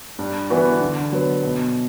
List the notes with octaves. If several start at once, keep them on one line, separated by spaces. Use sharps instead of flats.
G2
E3 B3 D4 F#4
D3
F#3 B3
B2